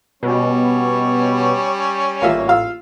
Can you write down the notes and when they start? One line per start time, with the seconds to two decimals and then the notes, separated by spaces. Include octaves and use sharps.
0.23 B2 G3 C#4 C#5
2.21 A1 A#3 F4 E5
2.48 F4 F5 E6